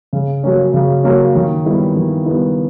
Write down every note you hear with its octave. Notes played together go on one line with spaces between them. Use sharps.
C#3
F#3 A#3 C#4
C#3
F#3 A#3 C#4
D#3
G3 B3 E4
D#3
G3 B3 E4